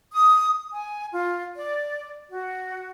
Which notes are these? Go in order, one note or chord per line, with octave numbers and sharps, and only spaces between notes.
D#6
G#5
F4
D5
F#4